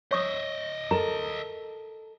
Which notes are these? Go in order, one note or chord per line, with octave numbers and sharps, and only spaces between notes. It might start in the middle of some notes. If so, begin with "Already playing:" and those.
C#5 D#5 E5 C#6 D#6
A4 A#4 A#5